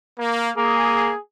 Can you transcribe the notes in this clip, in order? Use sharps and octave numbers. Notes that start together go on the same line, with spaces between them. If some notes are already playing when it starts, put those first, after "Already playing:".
A#3
A#3 G#4